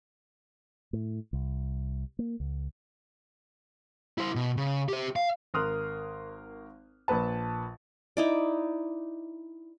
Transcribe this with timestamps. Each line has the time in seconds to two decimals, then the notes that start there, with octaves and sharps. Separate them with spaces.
0.93 A2
1.33 C2
2.19 A#3
2.40 C#2
4.18 E4 C5
4.35 B2
4.57 C#3
4.88 G4 C5
5.16 F5
5.54 G#1 A#4 C6 D#6 F6 F#6
7.08 A#1 A#2 B4 A5
8.17 D#4 E4 D5